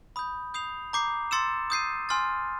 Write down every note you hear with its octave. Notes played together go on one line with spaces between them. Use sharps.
B5 D#6 G6
D#6 G6 C7 F7
A#5 D6 G6 C7
C6 E6 A6 C#7 E7
D#6 G6 C7 D#7
G#5 C6 F6 A6